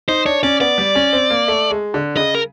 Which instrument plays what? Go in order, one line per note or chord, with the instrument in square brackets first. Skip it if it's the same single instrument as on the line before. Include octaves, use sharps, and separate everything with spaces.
[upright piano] D#4 [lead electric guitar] C5
[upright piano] D4 [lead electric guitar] C#5
[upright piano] C#4 [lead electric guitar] D5
[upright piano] B3 [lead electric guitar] D5
[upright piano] G3
C#4
C4
A#3
A3
G#3
D3
[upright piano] C#3 [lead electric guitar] D#5
[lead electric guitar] A#4